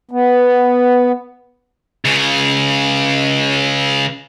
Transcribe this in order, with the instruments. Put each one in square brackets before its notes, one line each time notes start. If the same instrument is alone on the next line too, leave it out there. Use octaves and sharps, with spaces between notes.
[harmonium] B3
[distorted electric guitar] C#2 C#3